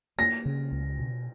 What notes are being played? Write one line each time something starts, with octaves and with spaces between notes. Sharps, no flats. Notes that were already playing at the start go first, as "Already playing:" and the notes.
A#3 A#6
C#3
C#2
B2